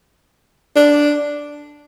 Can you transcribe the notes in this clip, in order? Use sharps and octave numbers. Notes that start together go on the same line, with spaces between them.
D4